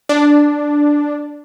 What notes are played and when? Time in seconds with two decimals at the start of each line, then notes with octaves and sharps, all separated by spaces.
0.09 D4